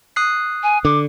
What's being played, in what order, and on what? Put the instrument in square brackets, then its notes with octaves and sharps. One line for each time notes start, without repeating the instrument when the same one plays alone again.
[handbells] D#6 F#6 C7
[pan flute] G#5
[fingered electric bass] D3 [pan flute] D6